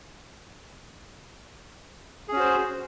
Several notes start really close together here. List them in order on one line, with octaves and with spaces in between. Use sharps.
G#4 C#4 F#4 C5